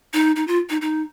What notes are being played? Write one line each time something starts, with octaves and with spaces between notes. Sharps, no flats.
D#4
D#4
F4
D#4
D#4